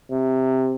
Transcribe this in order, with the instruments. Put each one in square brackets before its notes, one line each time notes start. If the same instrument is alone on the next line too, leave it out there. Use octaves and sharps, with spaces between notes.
[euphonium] C3